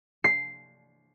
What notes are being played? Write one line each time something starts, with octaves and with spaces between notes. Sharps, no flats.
C7